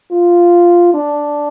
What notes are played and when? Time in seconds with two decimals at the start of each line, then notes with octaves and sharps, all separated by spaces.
0.12 F4
0.94 D4